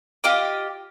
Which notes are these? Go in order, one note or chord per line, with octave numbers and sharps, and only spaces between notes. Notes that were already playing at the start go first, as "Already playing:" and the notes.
F4 G4 D#5 D6